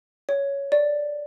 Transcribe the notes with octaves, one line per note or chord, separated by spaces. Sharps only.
C#5
D5